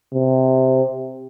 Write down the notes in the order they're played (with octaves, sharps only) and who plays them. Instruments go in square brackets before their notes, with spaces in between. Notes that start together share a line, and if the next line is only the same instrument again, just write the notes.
[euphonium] C3